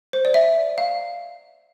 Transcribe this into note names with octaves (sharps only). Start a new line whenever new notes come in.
C5
D5
E5
F5